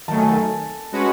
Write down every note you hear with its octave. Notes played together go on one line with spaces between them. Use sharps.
D#3 F#3 A3 A5
G#5
A4 A5
G#3 C#4 F#4 B4